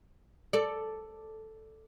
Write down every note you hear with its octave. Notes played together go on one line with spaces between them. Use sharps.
A4 D5